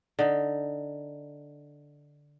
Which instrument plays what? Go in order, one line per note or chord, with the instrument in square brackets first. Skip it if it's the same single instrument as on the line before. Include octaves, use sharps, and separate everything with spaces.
[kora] D3 D#4